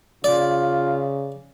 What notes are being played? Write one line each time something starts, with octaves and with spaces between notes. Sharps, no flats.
C#3 F4 D5